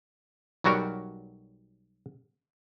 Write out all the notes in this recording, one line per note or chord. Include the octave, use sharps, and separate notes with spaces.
B1 F#3 G3 F#4 A#4